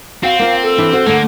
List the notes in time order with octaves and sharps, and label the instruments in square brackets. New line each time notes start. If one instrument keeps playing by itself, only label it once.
[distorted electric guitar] C4 [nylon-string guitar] F#4 [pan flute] F5
[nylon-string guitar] A#3 F4
[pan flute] A4
[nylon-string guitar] E3 D4 E4
F#4 C5
[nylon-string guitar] D3 A3 [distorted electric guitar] A#3